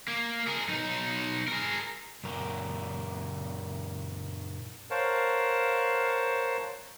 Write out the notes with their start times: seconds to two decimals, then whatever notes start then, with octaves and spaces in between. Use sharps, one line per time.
0.08 A#3
0.47 G#4 A#4
0.68 B1 D#4
1.48 G#4 A#4
2.24 F#2 A#2 A#4
4.90 A#4 C5 C#5 F5 F#5 A5